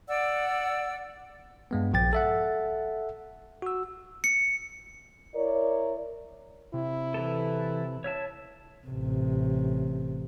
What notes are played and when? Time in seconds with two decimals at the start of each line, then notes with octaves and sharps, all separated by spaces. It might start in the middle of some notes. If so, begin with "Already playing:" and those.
0.08 D5 F#5 E6
1.71 G2 G#3 B3
1.93 A#1 F3 G5 A6
2.13 A4 E5 F#5
3.62 F#4 E6
4.24 C#7
5.35 E4 A#4 C#5 D5
6.74 C3 E4
7.14 E3 A4
8.04 C#5 E5 A5
8.87 A1 C3